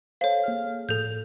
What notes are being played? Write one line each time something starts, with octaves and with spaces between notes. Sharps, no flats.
A4 C5 C#5 F5
A#3 G#4 F6
A2 F3 A4 G6